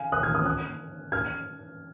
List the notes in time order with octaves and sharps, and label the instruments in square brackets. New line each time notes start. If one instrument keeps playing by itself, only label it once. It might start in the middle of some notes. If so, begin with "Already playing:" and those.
Already playing: [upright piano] F5 G#5
D#6 F#6
F6 G#6
D#6 F#6
D#6 F#6
F6 G#6